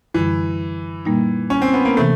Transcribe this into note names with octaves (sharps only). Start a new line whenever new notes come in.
F#2 D3 E3 G3
A#2 G3 A#3 D#4
C#4
C4
B3
A#3
C3 E3 A3